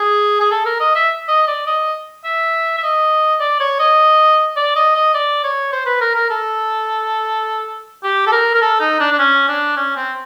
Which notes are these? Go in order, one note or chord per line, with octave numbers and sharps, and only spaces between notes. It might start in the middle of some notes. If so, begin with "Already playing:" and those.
Already playing: G#4
G#4
A4
A#4
D#5
E5
D#5
D5
D#5
E5
E5
D#5
D5
C#5
D#5
D5
D#5
D#5
D5
C#5
C5
B4
A#4
A#4
A4
G4
A4
A#4
A#4
A4
D#4
D4
D4
C#4
D4
C#4
C4